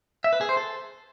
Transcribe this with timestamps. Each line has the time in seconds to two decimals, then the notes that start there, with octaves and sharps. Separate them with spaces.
0.24 E5
0.33 B4
0.41 G#4
0.49 C5
0.57 A4